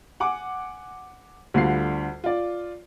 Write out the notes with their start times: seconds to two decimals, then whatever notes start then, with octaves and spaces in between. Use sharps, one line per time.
0.20 F#5 G#5 D6
1.54 D2 D3 G3 F4 C7
2.24 F4 D5